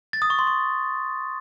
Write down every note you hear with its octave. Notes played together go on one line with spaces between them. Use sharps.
A6
D#6
C#6
C6
C#6